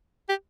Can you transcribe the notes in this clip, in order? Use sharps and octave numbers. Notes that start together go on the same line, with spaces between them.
G4